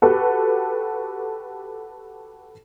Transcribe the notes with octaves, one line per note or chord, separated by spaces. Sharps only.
F#4 G4 A4 B4